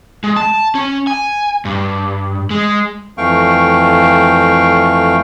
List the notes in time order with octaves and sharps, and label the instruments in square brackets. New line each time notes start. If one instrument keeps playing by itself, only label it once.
[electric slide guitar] G#3
A5
C#4
G#5
G2
G#3
[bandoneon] F2 E3 A3 F5 G5 C#6